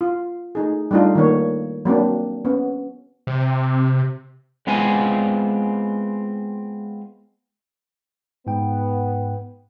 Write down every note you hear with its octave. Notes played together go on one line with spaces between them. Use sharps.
F4
A3 D#4 G#4
G3 A3 D4 D#4 F4
D#3 A3 A#3 C#5
F#3 A#3 C4 D4
B3 C#4
C3
G#3 B3 C4 F4 F5 G#5
G#2 B3 G5